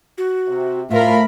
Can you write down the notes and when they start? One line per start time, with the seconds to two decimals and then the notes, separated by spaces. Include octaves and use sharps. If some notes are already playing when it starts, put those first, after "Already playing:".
0.18 F#4
0.48 C3
0.91 A2 F3 F4 A#4 E5 B5